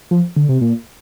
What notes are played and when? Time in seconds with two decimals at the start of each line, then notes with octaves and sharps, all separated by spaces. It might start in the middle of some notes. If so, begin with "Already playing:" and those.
0.11 F3
0.37 D3
0.49 C3
0.61 A#2